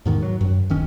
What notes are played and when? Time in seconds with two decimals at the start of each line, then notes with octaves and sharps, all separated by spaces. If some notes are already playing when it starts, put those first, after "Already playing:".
0.06 E2 G#2 D#3
0.23 F#3
0.41 F#2
0.70 D1 D#3 C#4